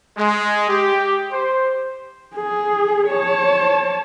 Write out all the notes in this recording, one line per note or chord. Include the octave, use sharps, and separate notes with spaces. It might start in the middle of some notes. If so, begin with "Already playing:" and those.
G#3
G4
C5
G#4
C#5 A5